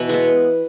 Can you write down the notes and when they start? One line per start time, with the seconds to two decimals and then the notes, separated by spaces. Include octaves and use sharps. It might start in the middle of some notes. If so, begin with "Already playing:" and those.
Already playing: B2 E3 B4 E5
0.09 G#3 B3